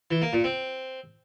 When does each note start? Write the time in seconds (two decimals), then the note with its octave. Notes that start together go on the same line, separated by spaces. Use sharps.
0.11 E3
0.22 A#3
0.33 A#2
0.44 C4